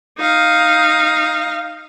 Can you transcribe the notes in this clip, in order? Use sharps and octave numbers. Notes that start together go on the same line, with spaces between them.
D#4 F5